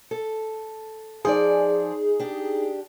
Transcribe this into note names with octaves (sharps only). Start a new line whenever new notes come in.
A4
F3 D#4 G#4 D5
D4 G4